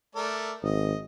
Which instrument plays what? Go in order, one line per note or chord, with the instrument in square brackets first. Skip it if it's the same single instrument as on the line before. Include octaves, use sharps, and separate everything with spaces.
[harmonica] A3 A#4 D5
[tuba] G#1 [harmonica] D#5